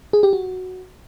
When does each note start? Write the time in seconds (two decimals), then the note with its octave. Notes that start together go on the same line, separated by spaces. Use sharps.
0.13 G#4
0.23 G4
0.33 F#4